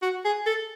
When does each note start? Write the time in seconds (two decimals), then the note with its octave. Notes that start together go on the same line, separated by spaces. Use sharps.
0.02 F#4
0.25 G#4
0.46 A4